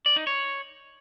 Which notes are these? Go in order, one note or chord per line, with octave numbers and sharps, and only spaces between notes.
D5
D#4
C#5